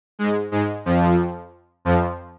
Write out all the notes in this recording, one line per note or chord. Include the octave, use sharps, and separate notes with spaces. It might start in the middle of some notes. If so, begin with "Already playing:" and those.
G#2 G#3
G#2 G#3
F2 F3
F2 F3